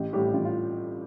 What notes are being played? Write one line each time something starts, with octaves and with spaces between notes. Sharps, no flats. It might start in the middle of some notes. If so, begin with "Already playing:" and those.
Already playing: A1 G4
A2 G3 G4
A1 F4
F4